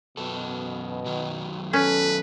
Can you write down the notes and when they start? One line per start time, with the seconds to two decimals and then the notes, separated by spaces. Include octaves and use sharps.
0.17 F#2 B2 A4
1.06 F#2 D#3 F#3
1.73 C#4 A4 B4